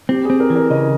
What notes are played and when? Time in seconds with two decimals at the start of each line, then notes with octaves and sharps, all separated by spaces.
0.09 C4 G4
0.25 G#4
0.30 C4
0.40 A#4
0.50 E3
0.56 A#4
0.70 C#3 D#5